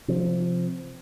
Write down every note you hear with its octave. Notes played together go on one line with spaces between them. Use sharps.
C3 F3 C4